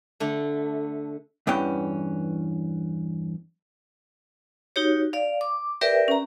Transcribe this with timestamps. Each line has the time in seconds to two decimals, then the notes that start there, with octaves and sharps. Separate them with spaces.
0.20 D3 A3
1.47 E2 G2 E3 C#4 G5
4.76 D#4 F#4 G4 C#5
5.13 D5 F5
5.41 D6
5.81 G4 A#4 B4 D5 E5 G5
6.08 C#4 A#5